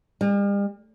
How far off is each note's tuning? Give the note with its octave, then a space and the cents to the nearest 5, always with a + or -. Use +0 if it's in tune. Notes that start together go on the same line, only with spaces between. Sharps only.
G3 +45